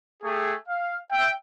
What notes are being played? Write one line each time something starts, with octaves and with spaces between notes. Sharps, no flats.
A3 G4 G#4
F5
E5 G5